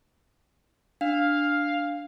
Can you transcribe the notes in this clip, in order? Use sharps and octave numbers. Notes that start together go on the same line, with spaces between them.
D4 F5